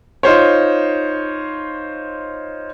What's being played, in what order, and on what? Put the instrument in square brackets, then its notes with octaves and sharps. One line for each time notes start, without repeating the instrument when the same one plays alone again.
[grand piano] D#4 F4 C5 C#5